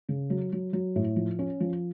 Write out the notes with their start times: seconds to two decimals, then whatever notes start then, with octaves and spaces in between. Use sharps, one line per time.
0.09 C#3
0.30 F#3
0.53 F#3
0.73 F#3
0.96 A2
1.16 F3
1.39 C#4
1.60 F3